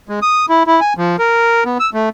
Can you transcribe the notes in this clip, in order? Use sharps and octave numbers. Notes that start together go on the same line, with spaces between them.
G#3
D#6
E4
E4
G#5
F3
A#4
B3
E6
A3